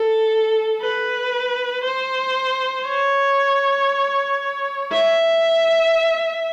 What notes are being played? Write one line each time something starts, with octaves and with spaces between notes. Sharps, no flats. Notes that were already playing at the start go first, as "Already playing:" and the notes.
Already playing: A4
B4
C5
C#5
E5